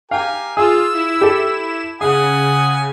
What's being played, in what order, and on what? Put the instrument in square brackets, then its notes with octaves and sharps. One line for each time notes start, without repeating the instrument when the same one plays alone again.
[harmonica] G4 A#4 G#5 [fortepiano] F5
[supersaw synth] F4 [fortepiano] G#4 [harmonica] E6
[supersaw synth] E4 E7
[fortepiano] G4 A4
[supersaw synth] C#3 [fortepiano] G#4 [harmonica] F#5 G#5 D#6